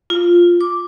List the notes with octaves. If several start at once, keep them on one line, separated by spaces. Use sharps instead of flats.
F4
D6